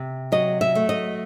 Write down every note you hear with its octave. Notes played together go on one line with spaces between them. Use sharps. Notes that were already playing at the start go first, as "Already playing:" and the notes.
Already playing: C3
F#3 D#5
E5
A3
D#5